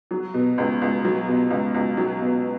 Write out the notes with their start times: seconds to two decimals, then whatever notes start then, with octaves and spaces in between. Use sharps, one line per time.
0.11 F#3
0.34 B2
0.58 C#2
0.82 C#2
1.05 F#3
1.28 B2
1.50 C#2
1.74 C#2
1.97 F#3
2.21 B2